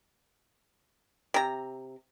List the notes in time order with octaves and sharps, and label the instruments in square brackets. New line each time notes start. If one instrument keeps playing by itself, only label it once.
[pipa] C3 A#5